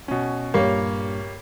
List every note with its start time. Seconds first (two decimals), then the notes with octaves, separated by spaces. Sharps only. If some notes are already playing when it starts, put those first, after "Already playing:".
0.08 B2 C#4
0.54 G2 A#2 G3 A#3 C#5